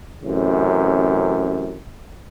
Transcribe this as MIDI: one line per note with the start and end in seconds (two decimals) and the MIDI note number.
0.23 1.76 33
0.23 1.76 42
0.23 1.76 48